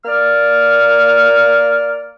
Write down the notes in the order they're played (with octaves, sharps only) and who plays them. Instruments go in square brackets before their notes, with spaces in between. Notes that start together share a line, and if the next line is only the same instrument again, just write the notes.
[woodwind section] A#3 D5 F6